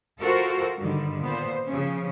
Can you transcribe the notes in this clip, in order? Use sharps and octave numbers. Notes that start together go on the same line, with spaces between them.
F4 F#4 A4 A#4 C5
G2 D3 D#3 G3
A#2 B3 C5
C#3 F3 C#4